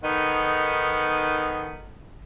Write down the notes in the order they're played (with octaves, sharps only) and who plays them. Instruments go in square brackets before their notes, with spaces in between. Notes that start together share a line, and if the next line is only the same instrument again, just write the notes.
[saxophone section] D#3 B3 D#4 A4